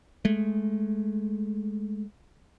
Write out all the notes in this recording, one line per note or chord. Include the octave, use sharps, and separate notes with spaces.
G#3 A3